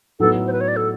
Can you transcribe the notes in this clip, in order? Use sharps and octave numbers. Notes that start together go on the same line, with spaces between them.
A2 F#3 B3 D#4 A4
C5
B4
C#5
D5
A4